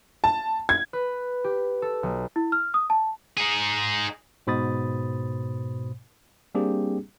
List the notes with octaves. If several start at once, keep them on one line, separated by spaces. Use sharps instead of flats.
A5
G#6
B4
G4
A4
B1
E4
F6
D#6
A5
D#4 G#4
G#2 B2 C5 B5 D#6 A6
G3 A#3 C4 D4 G4 G#4